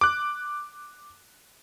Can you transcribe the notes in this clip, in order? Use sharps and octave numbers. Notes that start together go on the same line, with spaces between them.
D6 F#6